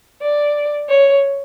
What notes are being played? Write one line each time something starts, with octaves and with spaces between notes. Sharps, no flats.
D5
C#5